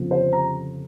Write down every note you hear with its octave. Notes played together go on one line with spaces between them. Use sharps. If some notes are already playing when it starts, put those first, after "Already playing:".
Already playing: G1 F2 C#3 F3 C4
C5
A#5